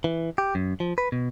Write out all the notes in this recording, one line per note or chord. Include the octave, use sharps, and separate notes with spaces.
E3
G4
F#2
F3
B4
B2